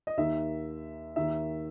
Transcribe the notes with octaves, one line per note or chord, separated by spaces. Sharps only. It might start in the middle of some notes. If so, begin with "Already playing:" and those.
D#5
D#2 D#3 E5
D#2 D#3 E5